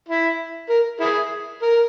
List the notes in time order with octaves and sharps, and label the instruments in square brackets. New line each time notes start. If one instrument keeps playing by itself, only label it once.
[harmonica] E4
A#4
E4 G#4
A#4